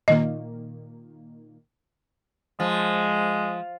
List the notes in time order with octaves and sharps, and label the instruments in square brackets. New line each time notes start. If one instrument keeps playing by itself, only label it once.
[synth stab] A#2 D#3 A#3 [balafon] D#5
[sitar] F3 [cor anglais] G#3